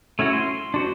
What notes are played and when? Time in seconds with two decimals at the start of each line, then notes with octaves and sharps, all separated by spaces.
0.19 A3 C#4 E4 F#4
0.33 C6
0.74 D4 F#4 C5